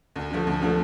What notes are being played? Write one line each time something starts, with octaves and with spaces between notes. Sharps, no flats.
D2
D3 F3 A3
D2
D3 F3 A3